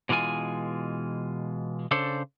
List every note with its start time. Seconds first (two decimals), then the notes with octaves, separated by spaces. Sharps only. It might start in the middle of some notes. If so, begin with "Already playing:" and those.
0.09 B2 E3 G#3 F4 G#5
1.91 C#3 D4 A4 C5